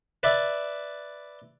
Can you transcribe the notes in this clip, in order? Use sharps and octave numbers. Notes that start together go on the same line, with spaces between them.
B4 D5 E5